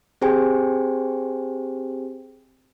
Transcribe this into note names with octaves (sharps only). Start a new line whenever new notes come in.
C4 G4 G#4 C5 G5 G#5